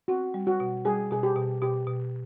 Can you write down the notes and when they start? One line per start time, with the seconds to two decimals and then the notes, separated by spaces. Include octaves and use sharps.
0.08 C4 F#4
0.34 G3
0.47 F#4
0.60 B2
0.85 G3 G#4
1.11 B2 G#4
1.23 G4
1.36 B2
1.62 B2 G4
1.87 B2